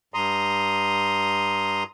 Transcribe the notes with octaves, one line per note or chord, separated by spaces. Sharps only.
G2 A#5 C6 D#6